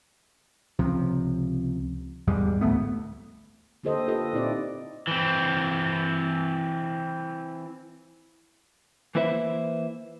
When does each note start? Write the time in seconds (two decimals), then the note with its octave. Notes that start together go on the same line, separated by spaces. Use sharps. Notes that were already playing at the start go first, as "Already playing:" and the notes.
0.79 C#2 C3 F3
2.27 E2 G#2 G3 G#3
2.61 A1 D2 A3 B3
3.83 D3 A#3 G4 A4 C5 D#5
4.08 F4 G4 A4 B4 C5 D#5
4.33 A#2 C4 D#4 E4 D5
5.07 E3 C4
9.15 E3 A#3 E4 B4 C5 E5